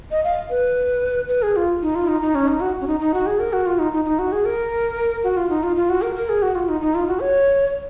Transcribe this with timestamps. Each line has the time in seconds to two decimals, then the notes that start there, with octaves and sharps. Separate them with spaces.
0.11 D#5
0.24 F5
0.50 B4
1.29 B4
1.42 G#4
1.56 F4
1.82 D#4
1.95 F4
2.08 D#4
2.22 D#4
2.35 C#4
2.48 D#4
2.61 F#4
2.81 C#4
2.87 D#4
3.00 D#4
3.14 F#4
3.27 G#4
3.40 A#4
3.53 F#4
3.66 F4
3.79 D#4
3.93 D#4
4.05 D#4
4.19 F#4
4.32 G#4
4.45 A#4
5.24 F#4
5.37 F4
5.50 D#4
5.63 F4
5.76 F4
5.90 F#4
6.02 A#4
6.15 A#4
6.29 G#4
6.42 F#4
6.55 F4
6.69 D#4
6.81 D#4
6.95 F4
7.08 F#4
7.20 C#5